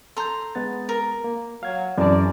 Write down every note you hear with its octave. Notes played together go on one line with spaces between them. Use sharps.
A4 A#5 C6 G6
G#3 B3 A6
A#4
A#3
F#3 F5 G#6
F#2 E3 G#4 D5 A5